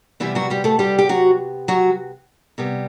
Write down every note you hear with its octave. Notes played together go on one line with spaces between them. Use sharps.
C3 E3 G3 B3 E4
F#3 F#4
G3 G4
A3 A4
G3 G4
G4
F#3 F#4
F#3 F#4
C3 G3 B3